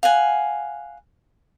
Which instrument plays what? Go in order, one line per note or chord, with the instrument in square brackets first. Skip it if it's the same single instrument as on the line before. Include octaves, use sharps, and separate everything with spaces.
[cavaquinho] F5 F#5 G#5